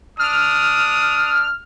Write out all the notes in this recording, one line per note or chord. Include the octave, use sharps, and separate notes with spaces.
D4 D#6 F6